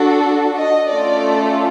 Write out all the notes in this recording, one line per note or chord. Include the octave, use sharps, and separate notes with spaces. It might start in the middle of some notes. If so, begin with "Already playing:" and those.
Already playing: D4 F#4 A4
D#5
A3 C#4 F4 A4 D5